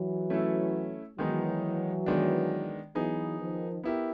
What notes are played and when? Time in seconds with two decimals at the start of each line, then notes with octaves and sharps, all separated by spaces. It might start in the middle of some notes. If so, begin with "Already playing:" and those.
Already playing: E3 F#3
0.30 A3 C#4 E4 A4
1.18 D#3 E3 F#3 G#3 B3 D#4
2.06 D#3 G#3 B3 D4
2.95 E3 F#3 B3 D#4 G#4
3.40 D#3 F3
3.84 B3 E4 G4 A#4